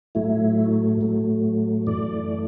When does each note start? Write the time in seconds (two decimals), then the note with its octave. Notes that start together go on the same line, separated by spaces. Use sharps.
0.15 A2 F#3 A3 E4
1.01 A2 F#3 A3
1.87 F#2 E3 A3 D5